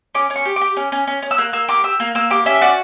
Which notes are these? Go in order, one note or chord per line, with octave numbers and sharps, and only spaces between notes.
C#4 D6
C#4
C#6
G4
D6
G4
C#4
C#4
C#4
C#4
E6
A#3 F#6
A#3 E6
G4 D6
G4 E6
A#3
A#3 E6
G4 D6
C#4 E5
F#4 D5